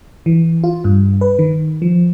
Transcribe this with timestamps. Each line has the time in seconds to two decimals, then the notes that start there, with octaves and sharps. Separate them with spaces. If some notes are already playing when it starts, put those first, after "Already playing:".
0.26 E3
0.64 F4
0.84 G2
1.21 B4
1.39 D#3
1.82 F3